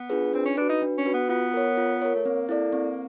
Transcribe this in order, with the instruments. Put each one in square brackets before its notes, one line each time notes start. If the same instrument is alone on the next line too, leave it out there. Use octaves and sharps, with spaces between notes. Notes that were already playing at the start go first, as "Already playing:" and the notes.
Already playing: [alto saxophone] B3
[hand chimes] D4 F4 G#4 B4
[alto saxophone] C4 [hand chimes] D4
[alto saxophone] C#4
[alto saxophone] D4 [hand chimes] F#4 B4
[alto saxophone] D#4
[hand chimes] D4
[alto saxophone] C#4
[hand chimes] F#4 B4
[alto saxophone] B3
[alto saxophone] B3 [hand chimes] F4
[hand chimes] A#4 C#5
F4
A#4 C#5
[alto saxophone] A3
[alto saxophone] A#3 [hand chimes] C4
[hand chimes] E4 A4 D5
C4